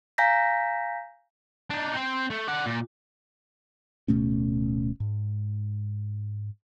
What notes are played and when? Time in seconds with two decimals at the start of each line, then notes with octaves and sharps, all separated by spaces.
0.18 F5 G#5 A#5 G6 A#6 B6
1.70 D4 D#4
1.95 C4 C5
2.30 A3
2.48 D5 F#5
2.66 A#2
4.08 D1 B2 A3 C#4
5.00 G#2